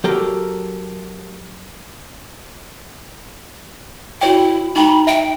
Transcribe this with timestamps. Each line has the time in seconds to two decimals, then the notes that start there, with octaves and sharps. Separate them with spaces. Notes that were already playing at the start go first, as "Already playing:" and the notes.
0.04 F#3 G4 A4 A#4 A#5
4.21 E4 F#4 C#5 G5
4.76 D#4 G5 A#5 B5
5.07 E5 G5